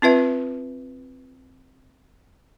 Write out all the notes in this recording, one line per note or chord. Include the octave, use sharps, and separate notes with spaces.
C4 F4 B4 E5